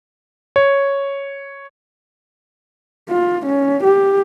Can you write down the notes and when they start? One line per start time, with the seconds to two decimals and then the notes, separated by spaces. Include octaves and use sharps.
0.56 C#5
3.10 F4
3.46 C#4
3.84 G4